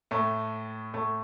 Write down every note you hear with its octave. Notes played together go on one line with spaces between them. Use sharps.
A2 A3
A2 A3